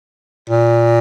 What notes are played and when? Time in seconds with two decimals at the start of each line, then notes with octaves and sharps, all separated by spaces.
0.49 A#2